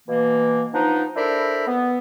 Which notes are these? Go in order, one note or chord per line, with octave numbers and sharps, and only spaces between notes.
B2 E3 A#3
F3 B3 D4 D#4
D4 E4 A4 A#4 C5 B5
B3